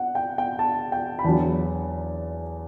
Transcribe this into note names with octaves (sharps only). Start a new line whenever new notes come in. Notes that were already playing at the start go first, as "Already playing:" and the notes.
Already playing: F#5
G5
G5
A5
G5
B5
E2 D3 F#3 A5